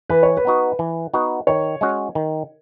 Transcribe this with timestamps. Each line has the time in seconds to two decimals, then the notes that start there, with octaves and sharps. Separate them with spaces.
0.09 E3 B4
0.23 C#5
0.37 B4
0.45 B3 D#4 F#4
0.79 E3
1.14 B3 D#4 F#4
1.47 D#3 C#5
1.81 G#3 C#4 F#4
2.15 D#3